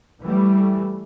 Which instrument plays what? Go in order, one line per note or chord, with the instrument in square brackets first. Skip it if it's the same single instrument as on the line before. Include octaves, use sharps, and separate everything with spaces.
[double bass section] E3 G3 A3